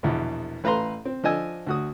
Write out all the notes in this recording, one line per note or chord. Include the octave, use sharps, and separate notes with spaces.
A#1 E2 B2
A1 B4 F5 A#5 C6
C4
F3 D4 D#5 G#5 E6
D2 F#4 D#6